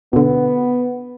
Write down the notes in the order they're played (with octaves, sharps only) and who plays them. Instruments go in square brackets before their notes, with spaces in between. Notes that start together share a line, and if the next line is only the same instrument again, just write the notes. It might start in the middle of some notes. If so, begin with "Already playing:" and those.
[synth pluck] B2 D3 [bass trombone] B3